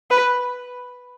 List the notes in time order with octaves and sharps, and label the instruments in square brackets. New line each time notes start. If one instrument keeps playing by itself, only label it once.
[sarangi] B4